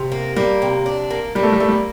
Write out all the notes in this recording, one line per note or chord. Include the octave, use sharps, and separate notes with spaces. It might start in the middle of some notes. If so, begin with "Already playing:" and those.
Already playing: C3
A#3
G3 A#3
C3
D4
A#3
G3 A#3
A3
G3
A3 A#3
G3